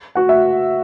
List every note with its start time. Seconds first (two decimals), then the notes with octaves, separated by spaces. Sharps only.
0.15 F#4 F#5
0.29 E5